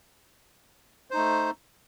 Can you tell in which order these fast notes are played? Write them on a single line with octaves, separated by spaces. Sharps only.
C5 D#4 A3